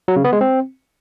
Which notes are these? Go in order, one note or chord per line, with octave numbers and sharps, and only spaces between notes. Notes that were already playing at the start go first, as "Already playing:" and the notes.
F#3
C#3
B3
G#3
C4